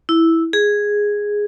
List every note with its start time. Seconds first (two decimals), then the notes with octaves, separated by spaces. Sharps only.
0.09 E4
0.53 G#4